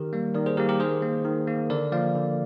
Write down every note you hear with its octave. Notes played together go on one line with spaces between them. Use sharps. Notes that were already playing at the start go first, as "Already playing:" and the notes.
Already playing: D#3 G4 A#4
G3 A#3
D#3 A#4 D5
G#4 C5
G3 A#3 G4 A#4
G4 A#4
D#3 G#4 C5
A#3
D#3
A#3
D3 A#4 D5
F3 A#3 D5 F5
D3